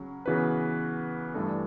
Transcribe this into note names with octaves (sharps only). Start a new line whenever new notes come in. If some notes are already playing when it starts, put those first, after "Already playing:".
Already playing: C#3 F#3 C#4
C#3 E3 B3 F#4 B4
G2 E3 A3 D4 A4